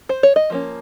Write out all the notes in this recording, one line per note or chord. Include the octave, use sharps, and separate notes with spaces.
C5
C#5
D#5
F3 A#3 C#4